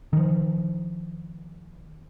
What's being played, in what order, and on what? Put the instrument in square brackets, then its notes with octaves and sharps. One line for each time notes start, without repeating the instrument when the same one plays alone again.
[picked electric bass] D#3 F3